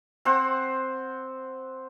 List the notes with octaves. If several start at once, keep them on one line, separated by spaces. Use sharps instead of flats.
C4 C5 F#5